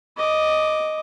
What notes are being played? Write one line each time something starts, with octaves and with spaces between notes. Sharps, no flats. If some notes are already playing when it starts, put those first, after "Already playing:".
D#5 D6